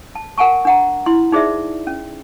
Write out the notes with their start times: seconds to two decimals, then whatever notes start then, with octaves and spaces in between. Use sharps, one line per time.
0.15 A5
0.38 A#4 F#5 G#5 A5 C#6
0.65 D4 F#5 A#5
1.06 E4 C6
1.32 D#4 G#4 C5 D5 E5
1.87 C#4